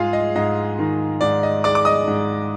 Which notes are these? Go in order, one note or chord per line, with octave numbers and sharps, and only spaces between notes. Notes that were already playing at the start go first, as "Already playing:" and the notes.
Already playing: G#2 G#3 F4 G#4 F5
D#5
G#2 D#5
D#3
G#2 D5
D#5
G#3 D5 D6
D6
D#5 D#6
G#2